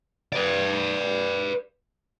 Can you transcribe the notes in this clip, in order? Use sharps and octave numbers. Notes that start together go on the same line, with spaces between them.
B4 D5